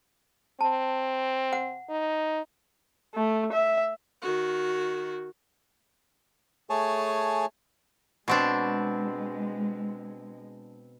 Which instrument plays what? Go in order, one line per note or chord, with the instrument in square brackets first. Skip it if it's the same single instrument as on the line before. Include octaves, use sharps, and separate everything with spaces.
[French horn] C4 [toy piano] A5
[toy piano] F#5
[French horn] D#4
[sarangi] A3
E5
[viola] D#3 F#4
[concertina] A3 G#4 C#5 G#5 A5
[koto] B2 C4 D4 [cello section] G#3